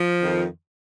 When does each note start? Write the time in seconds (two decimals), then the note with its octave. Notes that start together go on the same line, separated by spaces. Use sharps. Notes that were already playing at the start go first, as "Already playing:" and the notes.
Already playing: F3
0.20 F2 D#3